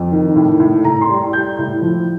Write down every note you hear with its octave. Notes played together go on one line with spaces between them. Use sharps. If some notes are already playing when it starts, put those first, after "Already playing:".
Already playing: F2
D#3
A2
A2
A2 A#5
C6
G3
G3 G6
A2
F3